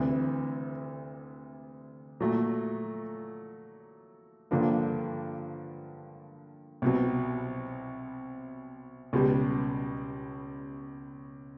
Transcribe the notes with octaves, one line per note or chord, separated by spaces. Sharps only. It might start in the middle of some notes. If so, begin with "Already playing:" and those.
Already playing: D2 C3 E3
A#2 F#3 A3
G2 D3 F3 A#3 D4
C2 B2 F#3
C#2 B2 G3